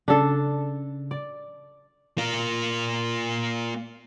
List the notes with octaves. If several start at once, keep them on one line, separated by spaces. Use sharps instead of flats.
C#3 D4 A4
D5
A#3 F4